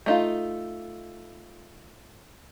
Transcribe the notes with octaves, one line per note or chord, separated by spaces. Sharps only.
A3 D#4 F4